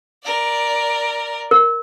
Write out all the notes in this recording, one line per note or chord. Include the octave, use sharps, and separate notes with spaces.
A#4 D5
A#4